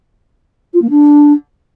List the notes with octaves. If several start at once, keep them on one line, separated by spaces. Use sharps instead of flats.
F4
A#3
D4